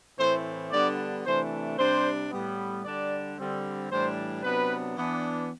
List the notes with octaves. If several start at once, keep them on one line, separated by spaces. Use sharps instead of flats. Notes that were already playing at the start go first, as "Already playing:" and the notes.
A2 E3 A3 C4 C5
D3 G3 B3 D4 D5
C3 E3 A3 D4 C5
C3 G3 D4 C5
A2 G3 B3
D3 G3 D4 D5
D3 G3 C4
A2 E3 G3 D4 C5
C3 F#3 B3 D4 B4
E3 B3 D4